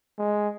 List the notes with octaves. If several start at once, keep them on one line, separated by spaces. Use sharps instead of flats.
G#3